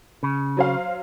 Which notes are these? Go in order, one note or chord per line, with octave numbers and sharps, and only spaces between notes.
C#3
F#3 C5 F5